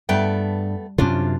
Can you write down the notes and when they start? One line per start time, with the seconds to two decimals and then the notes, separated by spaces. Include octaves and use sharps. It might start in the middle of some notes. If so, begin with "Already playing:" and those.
0.09 G2 A3 B3 G5
0.98 F#2 C3 C#4 D4 F4